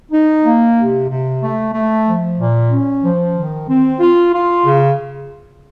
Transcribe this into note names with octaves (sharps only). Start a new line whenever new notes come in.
D#4
A#3
C3
C3
A3
A3
F3
A#2
C#4
F3
D#3
C4
F4
F4
C#3